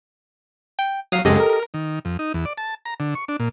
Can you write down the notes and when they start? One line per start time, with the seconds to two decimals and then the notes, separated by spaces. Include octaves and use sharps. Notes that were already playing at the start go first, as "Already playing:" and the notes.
0.79 G5
1.12 F#3 F5 D#6
1.25 F#2 C#3 G#3 G4 A4 D#5
1.40 A#4
1.74 D#3
2.05 F2
2.19 D#4
2.34 E2
2.45 D5
2.58 A5
2.85 A#5
3.00 D3
3.15 C#6
3.28 D4
3.40 A#2